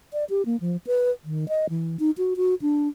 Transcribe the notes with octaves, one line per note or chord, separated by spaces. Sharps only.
D5
G4
A#3
F3
B4
D#3
D#5
E3
D#4
F#4
F#4
D4